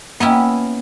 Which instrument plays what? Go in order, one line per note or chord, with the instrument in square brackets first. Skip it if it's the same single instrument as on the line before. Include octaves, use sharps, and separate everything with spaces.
[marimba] A#3 G5 [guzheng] B3 C#4 E4